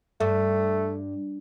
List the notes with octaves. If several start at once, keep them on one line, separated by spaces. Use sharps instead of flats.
G2 A3